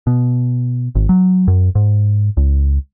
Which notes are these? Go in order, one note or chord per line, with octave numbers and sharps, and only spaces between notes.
B2
G#1
F#3
F#2
G#2
C#2